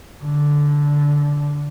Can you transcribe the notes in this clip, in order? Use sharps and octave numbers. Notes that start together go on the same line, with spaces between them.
D3